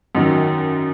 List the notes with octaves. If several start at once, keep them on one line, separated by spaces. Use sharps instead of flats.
F#2 D#3 F#3